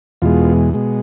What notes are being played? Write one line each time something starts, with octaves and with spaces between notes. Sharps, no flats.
E2 B2 G#3 F4
B2 G#3